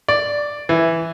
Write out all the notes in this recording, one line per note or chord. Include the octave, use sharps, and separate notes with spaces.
D5
E3